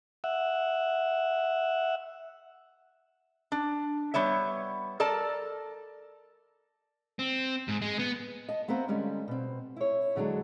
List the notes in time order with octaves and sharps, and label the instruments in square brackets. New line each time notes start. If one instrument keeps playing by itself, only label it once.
[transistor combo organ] E5 F#5
[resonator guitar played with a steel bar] D4
G3 B3 C#5 E5
A4 A#4 D5 A5
[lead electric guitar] C4
G#2
G#3
B3
[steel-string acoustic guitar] D#5 A5
A3 B3 C4 A#4 C5 F5
D3 G3 G#3 C#4
B2 C4
E4 C#5
E2 D3 F#3 G#3 D4